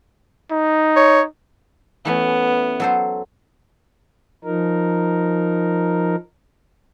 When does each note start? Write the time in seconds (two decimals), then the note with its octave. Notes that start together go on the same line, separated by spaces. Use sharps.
0.51 D#4
0.96 C#5
2.05 E3 A3 B3 C#4
2.80 F#3 A4 C5
4.44 F3 D#4 A#4